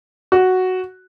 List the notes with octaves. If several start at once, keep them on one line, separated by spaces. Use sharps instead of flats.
F#4